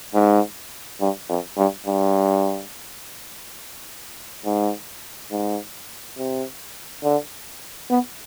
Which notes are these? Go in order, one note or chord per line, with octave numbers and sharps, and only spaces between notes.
G#2
G2
F2
G2
G2
G#2
G#2
C3
D3
B3